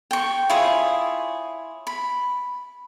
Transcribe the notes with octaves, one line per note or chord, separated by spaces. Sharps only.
G5 C#6
E4 F4 G#4 C#5
B5